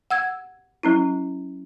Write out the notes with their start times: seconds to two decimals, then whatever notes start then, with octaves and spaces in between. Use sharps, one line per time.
0.10 F#5 E6 G#6
0.83 F#3 C#4 E4